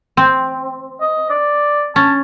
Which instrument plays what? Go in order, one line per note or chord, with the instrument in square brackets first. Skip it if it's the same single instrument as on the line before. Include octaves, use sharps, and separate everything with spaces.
[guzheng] C4
[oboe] D#5
D5
[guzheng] C#4 [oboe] A5